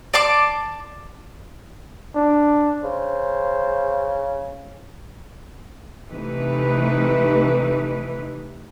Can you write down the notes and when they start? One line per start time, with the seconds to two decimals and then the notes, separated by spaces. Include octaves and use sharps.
0.14 D5 A5 C6 D6
2.15 D4
2.83 C#3 C5
6.10 C3 E3 A3 D#4 B4